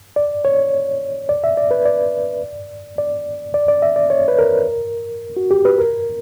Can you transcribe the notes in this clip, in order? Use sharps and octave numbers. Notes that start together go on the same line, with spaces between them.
D5
C#5
D5
E5
D5
B4
D5
D5
D5
D5
E5
D5
C#5
B4
A#4
F#4
G4
B4
A#4